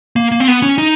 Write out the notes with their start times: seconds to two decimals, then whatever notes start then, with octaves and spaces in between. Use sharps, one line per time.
0.16 A#3
0.32 A#3
0.40 C4
0.48 B3
0.62 C#4
0.78 D#4